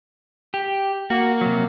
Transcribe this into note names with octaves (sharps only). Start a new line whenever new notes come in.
G4
A#3 F#4
C3 F#3